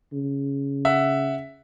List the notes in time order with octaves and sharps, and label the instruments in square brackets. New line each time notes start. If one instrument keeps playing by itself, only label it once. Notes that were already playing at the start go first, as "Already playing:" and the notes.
[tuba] C#3
[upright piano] E5 F#5